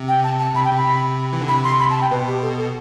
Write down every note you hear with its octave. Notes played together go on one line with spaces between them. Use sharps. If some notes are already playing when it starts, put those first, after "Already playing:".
Already playing: C3
G5
A5
A5
C3 B5
G5
C3
B5
C3
E3
D3
C3 B5
C6
B5
A5
G5
B2 B4
G4
A4
A4